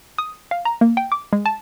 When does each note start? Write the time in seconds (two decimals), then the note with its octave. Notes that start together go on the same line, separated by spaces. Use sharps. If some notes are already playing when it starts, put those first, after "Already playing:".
0.18 D#6
0.51 F5
0.65 A#5
0.81 A#3
0.97 G5
1.12 D6
1.33 G#3
1.46 A5